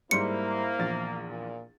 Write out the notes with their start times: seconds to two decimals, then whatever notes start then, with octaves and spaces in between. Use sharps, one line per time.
0.11 G#2 G3 A#3 E4 C5 C6 C#7
0.78 A#1 E2 A6
1.27 A#2